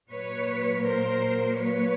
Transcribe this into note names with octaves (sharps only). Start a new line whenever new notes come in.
A#2 F#3 A#3 B4 C#5
A#4 C5
B4 C#5